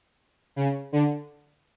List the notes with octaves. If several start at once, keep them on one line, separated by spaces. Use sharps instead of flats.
C#3
D3